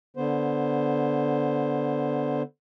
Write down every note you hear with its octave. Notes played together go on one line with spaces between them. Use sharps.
D3 B3 C5